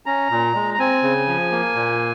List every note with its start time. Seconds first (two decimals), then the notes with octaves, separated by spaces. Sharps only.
0.06 C#4 A#5
0.30 A#2
0.54 G#3
0.74 A#5
0.79 C4 G#5
1.03 C#3
1.27 F3
1.51 A#3
1.75 A#2